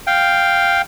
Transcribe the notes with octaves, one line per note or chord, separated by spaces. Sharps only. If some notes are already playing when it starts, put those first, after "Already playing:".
F5 G5